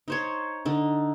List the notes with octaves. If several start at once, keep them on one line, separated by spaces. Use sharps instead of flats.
D#4 C5 C#5
D3 D#4